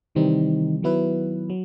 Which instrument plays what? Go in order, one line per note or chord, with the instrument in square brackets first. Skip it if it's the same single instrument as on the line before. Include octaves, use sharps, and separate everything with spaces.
[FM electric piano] C3 E3 G3 C4 D#4 [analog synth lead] D#3
[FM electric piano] D#3 F#3 B3 E4 B4
F#3